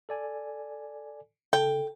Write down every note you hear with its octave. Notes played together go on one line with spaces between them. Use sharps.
A4 D5 G#5
C#3 A4 G5